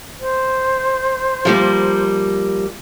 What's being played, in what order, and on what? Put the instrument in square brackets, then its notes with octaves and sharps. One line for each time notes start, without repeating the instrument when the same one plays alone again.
[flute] C5
[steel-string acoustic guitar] F3 G3 A#3